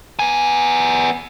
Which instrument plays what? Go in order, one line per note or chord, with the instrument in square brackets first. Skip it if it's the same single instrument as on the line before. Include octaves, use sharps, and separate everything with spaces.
[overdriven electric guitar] B3 G#5